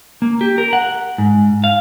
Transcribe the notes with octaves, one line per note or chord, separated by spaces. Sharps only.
A#3
G4
A#4
F#5
G#2
F5